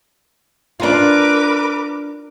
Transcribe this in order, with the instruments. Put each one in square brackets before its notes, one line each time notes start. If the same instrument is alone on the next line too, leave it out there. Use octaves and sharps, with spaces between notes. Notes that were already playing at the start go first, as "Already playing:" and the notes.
[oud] D4 F4 [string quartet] A#4 B4 D6